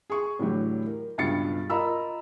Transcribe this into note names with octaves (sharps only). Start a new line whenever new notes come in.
G#4 C#6
A2 D3 E3 F#3 G4
A#4
C#2 G2 B2 A6 C#7
F4 A#4 D#5 A#5 B5 E6